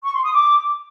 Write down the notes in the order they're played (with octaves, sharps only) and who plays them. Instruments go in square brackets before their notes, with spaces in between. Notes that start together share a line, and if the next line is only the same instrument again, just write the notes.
[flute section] C#6
C6
D#6
D6